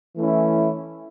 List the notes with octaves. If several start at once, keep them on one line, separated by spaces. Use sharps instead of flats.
E3 A3 C#4 E4